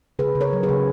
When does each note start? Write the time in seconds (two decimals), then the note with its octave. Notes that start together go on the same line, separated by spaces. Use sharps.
0.19 C#3 G#4 B4
0.35 C#3
0.41 A#4 C#5
0.53 F#3
0.63 G#4 B4
0.69 C#3